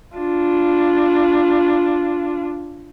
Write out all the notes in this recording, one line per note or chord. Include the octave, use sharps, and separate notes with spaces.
D4 F4